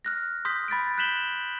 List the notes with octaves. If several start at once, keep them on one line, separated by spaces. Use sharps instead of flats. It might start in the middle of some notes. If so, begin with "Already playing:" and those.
F6 F#6 A#6
C6 D#6 G6 B6
B5 A6 B6 D7
F#6 G6 B6 E7 F#7 G7